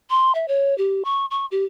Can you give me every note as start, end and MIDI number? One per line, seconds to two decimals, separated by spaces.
0.10 0.32 84
0.35 0.48 76
0.48 0.76 73
0.78 1.03 67
1.05 1.26 85
1.31 1.46 85
1.51 1.65 67